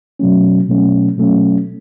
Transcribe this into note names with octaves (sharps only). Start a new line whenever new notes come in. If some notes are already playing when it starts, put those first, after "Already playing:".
B2 F#3 A3 C#4
B2 F#3 A3 C#4
B2 F#3 A3 C#4